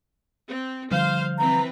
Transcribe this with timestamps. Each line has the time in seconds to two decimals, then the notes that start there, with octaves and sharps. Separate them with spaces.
0.49 C4
0.92 D3 F3 G3 C5 F5
1.39 E3 C4 B4 A#5